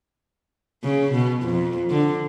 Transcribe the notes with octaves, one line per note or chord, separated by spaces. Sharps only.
C#3
B2
F2
D3